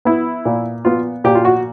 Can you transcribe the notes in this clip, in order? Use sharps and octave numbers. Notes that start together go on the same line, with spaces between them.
B3 E4
A#2
B3 F4
A#2 G4
F4
F#4